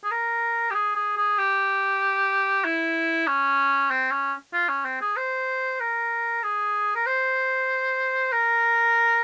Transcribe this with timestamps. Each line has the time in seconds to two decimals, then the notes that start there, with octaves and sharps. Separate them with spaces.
0.04 G#4
0.11 A#4
0.71 G4
0.74 G#4
0.95 G#4
1.17 G#4
1.38 G4
2.65 E4
3.27 C#4
3.90 C4
4.11 C#4
4.54 F4
4.69 C#4
4.85 C4
5.01 G#4
5.16 C5
5.80 A#4
6.43 G#4
6.96 A#4
7.06 C5
8.32 A#4